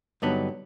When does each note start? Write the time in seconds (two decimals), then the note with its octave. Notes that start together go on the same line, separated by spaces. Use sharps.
0.22 G2 D3 F#3 B3 D#4